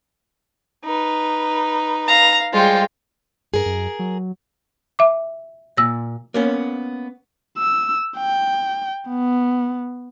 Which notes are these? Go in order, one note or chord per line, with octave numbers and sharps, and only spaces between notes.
D#4 B4
F5 A#5
G3 G#3 F4 C5 G5
G2 G#4 A#4
F#2
F#3
E5 D6
A#2 E6 A#6
A#3 B3 C#4
E6
G5
B3